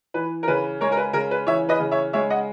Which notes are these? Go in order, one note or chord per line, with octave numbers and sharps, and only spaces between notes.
E3 B4
A#4
C#3 B4
G#3 A#4 C#5
A#4
B4
C#3 A#4
B4
E3 C#5 E5
B4 D#5
C#3
C#5 E5
G#3 C#5 E5
D#5 F#5